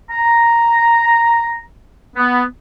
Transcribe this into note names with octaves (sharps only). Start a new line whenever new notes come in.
A#5
B3